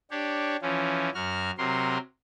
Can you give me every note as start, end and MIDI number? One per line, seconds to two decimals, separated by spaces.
0.11 0.57 62
0.11 0.57 67
0.11 0.57 73
0.62 1.10 52
0.62 1.10 53
0.62 1.10 61
1.14 1.51 42
1.14 1.51 66
1.14 1.51 89
1.58 1.98 48
1.58 1.98 54
1.58 1.98 70
1.58 1.98 84